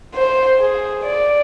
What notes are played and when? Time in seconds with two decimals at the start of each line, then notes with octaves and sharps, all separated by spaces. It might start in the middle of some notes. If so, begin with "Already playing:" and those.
0.15 C5
0.60 G#4
1.03 D5